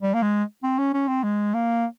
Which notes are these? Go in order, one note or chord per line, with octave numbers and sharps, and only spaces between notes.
G3
A#3
G#3
C4
C#4
C#4
C4
G#3
A#3